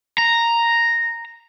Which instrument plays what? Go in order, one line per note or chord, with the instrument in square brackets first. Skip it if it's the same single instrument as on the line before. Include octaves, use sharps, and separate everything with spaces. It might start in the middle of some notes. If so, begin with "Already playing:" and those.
[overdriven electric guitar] A#5